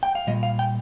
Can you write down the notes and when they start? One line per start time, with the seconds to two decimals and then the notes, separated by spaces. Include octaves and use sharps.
0.03 G5
0.15 F5
0.27 A#2 G3 D#5
0.43 F5
0.59 G5